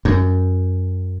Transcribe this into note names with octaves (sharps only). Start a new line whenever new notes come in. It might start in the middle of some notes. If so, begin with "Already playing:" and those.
F#2